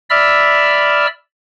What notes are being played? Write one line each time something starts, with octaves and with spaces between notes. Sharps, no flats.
D5 E5 B5 E6 F6